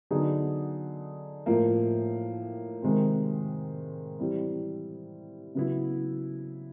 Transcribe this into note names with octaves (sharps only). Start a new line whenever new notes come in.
D3 F#3 B3 D#4 G#4
A2 F3 A#3
C3 D#3 G#3 C4
E3 G3 C4 E4
C#3 F#3 B3 E4